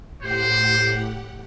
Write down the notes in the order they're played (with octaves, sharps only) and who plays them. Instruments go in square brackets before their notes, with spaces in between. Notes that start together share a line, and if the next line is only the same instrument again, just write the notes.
[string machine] A2 G4 F#5 [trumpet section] C5